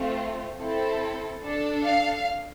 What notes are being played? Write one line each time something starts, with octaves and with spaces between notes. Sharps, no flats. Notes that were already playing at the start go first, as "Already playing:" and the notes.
Already playing: A3 C4 F4
C4 E4 A4
D4 A4
F5